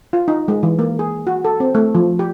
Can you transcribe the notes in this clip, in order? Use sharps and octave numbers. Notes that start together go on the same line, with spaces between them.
F4
D#4
G#3
E3
A#3
G#4
F#4
A4
C4
A3
F3
G4